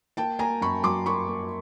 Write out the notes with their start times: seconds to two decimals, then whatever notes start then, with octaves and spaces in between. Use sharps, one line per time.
0.17 A#3 G5 A5
0.39 A#3 G#5 A#5
0.61 F#2 B5 C#6
0.84 F#3 C6 D6
1.06 A#3 B5 C#6
1.27 A#3